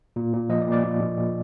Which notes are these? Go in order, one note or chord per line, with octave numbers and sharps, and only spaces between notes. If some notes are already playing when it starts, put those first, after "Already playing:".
A#2
A#2
F3 D#5
D5
A#2
D5
A#2
A#2
A#2